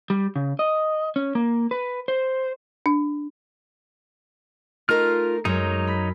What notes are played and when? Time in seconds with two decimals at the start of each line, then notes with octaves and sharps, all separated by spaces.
0.10 G3
0.36 C#3
0.59 D#5
1.16 C#4
1.35 A#3
1.71 B4
2.08 C5
2.86 D4
4.89 A3 D#4 F4 A#4 F6
5.45 F#2 G#3 D#4 C#5
5.87 B5